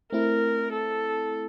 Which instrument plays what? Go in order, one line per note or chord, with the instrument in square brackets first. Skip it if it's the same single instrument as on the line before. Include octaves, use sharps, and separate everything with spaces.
[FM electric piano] A3 C4 E4 [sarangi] A#4
[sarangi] A4